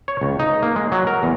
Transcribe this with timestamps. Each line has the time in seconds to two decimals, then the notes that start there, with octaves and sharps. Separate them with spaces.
0.08 C#5
0.22 C#2
0.39 D#4
0.63 A#3
0.76 G#3
0.92 F#3
1.07 A#4
1.23 E2